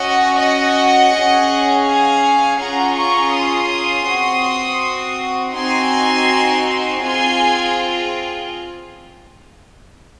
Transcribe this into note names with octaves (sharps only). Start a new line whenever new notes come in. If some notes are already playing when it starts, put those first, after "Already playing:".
Already playing: C#4 F#4 D#5 F#5
D#5 F#5
C#4 G#4
F5 G#5
C#4 F4 G#4 F#5 A#5
A#5 C#6
C6 D#6
C4 F#4
C4 D#4 F#4 G#5 C6
C4 F4 G#4 G#5 C6